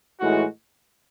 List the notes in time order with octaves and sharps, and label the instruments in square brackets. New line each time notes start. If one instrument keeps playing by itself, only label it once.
[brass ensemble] A2 E3 G#3 D#4 F#4